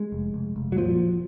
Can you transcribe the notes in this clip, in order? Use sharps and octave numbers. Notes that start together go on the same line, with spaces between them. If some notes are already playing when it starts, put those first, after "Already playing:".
Already playing: G#3
F1
F1
F1
F#3
A#2 F3